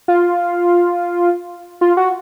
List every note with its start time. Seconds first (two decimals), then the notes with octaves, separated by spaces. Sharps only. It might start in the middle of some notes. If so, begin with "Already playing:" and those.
0.08 F4
1.81 F4
1.97 F#4